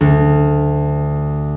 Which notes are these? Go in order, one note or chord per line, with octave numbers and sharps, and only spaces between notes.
D2